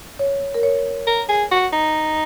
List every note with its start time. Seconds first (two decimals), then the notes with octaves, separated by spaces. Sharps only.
0.19 C#5
0.54 A#4
0.63 C#5
1.07 A#4
1.29 G#4
1.51 F#4
1.73 D#4